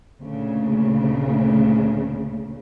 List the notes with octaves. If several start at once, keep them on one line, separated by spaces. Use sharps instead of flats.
D2 A#2 C#3